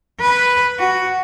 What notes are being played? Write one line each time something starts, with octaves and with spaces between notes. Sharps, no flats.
B4
F#4